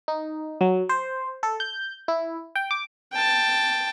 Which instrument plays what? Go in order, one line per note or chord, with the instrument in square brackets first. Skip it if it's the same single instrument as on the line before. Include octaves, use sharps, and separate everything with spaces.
[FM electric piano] D#4
F#3
C5
A4
G6
E4
G5
D6
[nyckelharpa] G5 A5